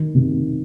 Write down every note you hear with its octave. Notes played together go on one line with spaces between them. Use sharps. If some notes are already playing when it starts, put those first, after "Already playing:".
Already playing: D#3
C3